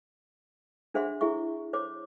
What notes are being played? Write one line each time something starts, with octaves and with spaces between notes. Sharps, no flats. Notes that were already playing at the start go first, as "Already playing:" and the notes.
D4 G#4 C5 E5 F#5 C6
E4 G#4 E5 C#6
C5 C#5 D6